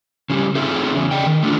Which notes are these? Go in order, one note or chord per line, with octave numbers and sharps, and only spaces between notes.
C#3 F3 G3
A3 C4 D#4 F4 G#4 E5
E2 C#3
D5 D#5 G5
D#3
A3 D4 F4